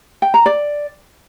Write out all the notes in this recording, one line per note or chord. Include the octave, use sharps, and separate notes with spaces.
G5
A#5
D5